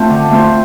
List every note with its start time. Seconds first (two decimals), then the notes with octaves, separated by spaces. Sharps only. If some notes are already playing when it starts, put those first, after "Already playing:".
Already playing: A3 C4 F4 C5
0.09 D3
0.31 A3 C4 F4 C5